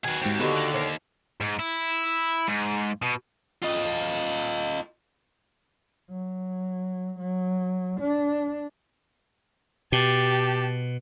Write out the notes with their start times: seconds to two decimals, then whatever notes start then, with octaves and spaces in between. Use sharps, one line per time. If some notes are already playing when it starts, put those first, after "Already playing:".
0.05 D#3 F#4 G#4 B4
0.22 D#2 G#2 C4 G4 G5
0.40 D3 B3 F#4 G4 B4 D#5
0.55 A#5 D6 F#6
0.74 A#4 C5 C#5
1.41 G#2
1.59 E4
2.48 G#2
3.02 B2
3.63 F4 D#5
6.10 F#3
7.19 F#3
8.00 D4
9.92 B2 G4 A5